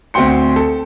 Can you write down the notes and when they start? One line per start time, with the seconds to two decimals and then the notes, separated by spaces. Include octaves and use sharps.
0.14 D2 C4 F#4 G5 C6 C#7
0.56 A4